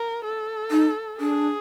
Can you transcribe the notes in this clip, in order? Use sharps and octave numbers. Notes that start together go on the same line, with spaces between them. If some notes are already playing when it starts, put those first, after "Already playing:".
Already playing: A#4
A4
D#4
D4 G#4